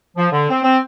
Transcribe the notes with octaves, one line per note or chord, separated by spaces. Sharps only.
F3
D3
C4
C4